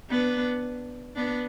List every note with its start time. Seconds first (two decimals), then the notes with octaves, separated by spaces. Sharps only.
0.10 B3 D4
1.16 B3 D4